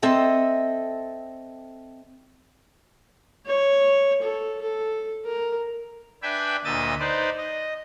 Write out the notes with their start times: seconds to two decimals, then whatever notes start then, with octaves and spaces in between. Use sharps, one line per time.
0.02 C4 A4 D#5 E5
3.46 C#5
4.22 A4
4.62 A4
5.26 A#4
6.23 D4 B4 E5 G5 G#5 B5
6.65 D2 A#2 D#5 E5 D#6 A6
7.00 D#4 B4 C5 D5
7.38 D#5